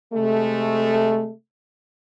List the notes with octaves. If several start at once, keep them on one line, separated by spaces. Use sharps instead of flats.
C3 G#3 A3